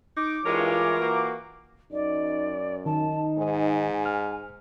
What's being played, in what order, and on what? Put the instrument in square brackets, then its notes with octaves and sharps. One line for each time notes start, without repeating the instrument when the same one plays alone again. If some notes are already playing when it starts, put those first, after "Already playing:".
[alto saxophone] D#4 [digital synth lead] D6
[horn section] G2 G#3 C#5 [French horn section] E3 F4 [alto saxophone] A#4
[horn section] A#3 F#4
[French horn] F#2 [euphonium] D#4 [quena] D5
[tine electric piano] D#3 [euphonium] D#4 [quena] A5
[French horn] G#2 [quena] G#5
[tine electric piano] F6